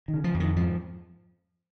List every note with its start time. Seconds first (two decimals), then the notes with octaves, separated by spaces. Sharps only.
0.08 D#3
0.14 C#3
0.24 F3
0.34 F2
0.40 D#3
0.56 G#2 F3